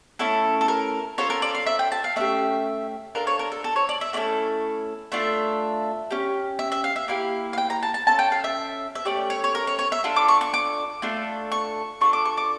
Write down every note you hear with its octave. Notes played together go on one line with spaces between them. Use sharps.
A3 C#4 E4 A4
A4
A#4
C#4 F4 A4 C#5
A#4
D5
F5
E5
G5
A5
F5
A3 C#4 G4 E5
D4 F4 A4 A#4
C#5
A#4
A4
A4
C#5
D5
E5
A3 C#4 E4 A4 D5
A3 D4 F4 E5
C#4 G4
E5
E5
F5
E5
A#3 E4 G4 F5
F5
G5
A#5
A5
A5
C#4 F4 A4 A5
G5
F5
E5
E5
A3 C#4 G4 D5
C#5
C#5
A#4
C#5
C#5
E5
D4 F4 A4
D6
C#6
C#6
D6
A3 D4 F4 A4
C#6
D4 F4 A4 C#6
D6
C#6
D6